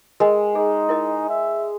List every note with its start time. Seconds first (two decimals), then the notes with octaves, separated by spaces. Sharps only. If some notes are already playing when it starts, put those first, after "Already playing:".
0.20 G#3 A#4 D#5
0.55 D#4 G#4
0.89 E4 A#4 D#5
1.29 E5